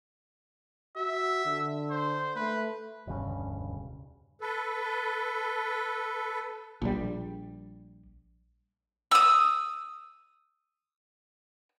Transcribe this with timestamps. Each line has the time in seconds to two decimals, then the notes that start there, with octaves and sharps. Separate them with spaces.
0.96 F#4 E5
1.46 D3
1.90 C5
2.36 A3 B4
3.07 E1 D2 G2 C#3
4.41 A4 B4
6.82 A#1 G3
9.11 D#6 E6